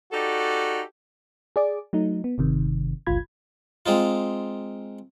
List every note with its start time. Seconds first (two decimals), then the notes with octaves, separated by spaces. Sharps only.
0.12 D#4 F#4 G4 A4 D5
1.56 G#4 D5 D6
1.93 F#3 A3 D#4
2.24 B3
2.38 G1 C3 D#3
3.07 G1 C#2 G2 F4 B5 G#6
3.86 G#3 C4 D#4 F4